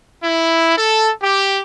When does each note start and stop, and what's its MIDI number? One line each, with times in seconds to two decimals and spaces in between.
0.24 0.73 64
0.77 1.11 69
1.22 1.62 67